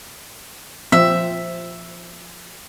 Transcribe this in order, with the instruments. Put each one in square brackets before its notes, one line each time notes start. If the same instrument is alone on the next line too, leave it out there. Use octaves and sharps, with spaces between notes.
[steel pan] F3 C4 [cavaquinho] E5